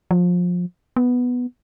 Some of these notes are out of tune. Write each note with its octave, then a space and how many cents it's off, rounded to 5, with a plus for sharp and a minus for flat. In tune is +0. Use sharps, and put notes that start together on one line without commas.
F3 +25
B3 +0